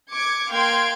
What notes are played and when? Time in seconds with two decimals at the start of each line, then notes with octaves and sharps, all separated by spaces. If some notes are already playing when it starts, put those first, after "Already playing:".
0.12 D6 G#6 C#7
0.50 A#3 F5 G5 C6 G#6 D7